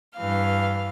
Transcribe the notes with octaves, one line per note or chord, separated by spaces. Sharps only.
G2 E3 F5 F6